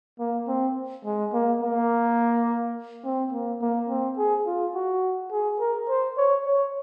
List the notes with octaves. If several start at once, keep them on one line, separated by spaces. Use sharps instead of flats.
A#3
C4
G#3
A#3
A#3
C4
A#3
A#3
C4
G#4
F4
F#4
G#4
A#4
C5
C#5
C#5